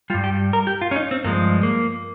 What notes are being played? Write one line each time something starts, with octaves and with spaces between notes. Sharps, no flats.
G2 G3 F4
G4
A#4
G4
F4
C#4
D#4
C4
G2 F3 G#3 A#3
A#3